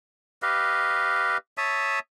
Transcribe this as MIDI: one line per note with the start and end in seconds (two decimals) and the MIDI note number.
0.42 1.37 67
0.42 1.37 71
0.42 1.37 75
0.42 1.37 77
1.58 1.99 73
1.58 1.99 76
1.58 1.99 81
1.58 1.99 87